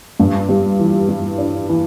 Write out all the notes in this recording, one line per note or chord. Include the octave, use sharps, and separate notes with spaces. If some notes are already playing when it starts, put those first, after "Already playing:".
G2
G3
E3
G3
D4
E3